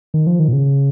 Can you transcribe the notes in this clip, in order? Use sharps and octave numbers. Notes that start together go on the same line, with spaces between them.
D#3
F3
D#3
A#2
C#3